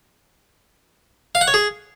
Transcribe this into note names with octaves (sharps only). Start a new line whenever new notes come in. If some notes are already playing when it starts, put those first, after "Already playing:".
F5
F#5
C#5
G#4